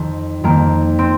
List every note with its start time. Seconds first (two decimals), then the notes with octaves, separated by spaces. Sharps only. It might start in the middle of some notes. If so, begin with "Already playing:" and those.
Already playing: F2 D#3
0.44 F2 D#3 A#3
0.99 C4